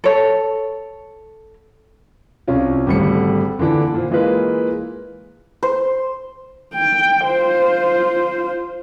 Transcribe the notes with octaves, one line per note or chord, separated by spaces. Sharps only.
A4 C#5
C2 C#4 F4
G#1 D3 G3 A3 C#7
A#2 D3 E3 D4
A#2 C5
E3 G#3 A#3 F4 B4
C5
G5
F4 C5